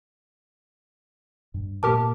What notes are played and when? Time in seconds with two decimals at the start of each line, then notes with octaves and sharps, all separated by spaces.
1.54 G2
1.83 A#2 A#3 G4 A#4 A5 D6